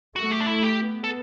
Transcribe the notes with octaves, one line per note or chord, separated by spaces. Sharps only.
A3 F#4
G4
D4
E4
G4
B3
A4